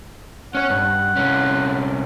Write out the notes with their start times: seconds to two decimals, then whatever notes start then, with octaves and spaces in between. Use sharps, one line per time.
0.55 C#4 C#5 F#5
0.70 G2
1.16 C2 C#4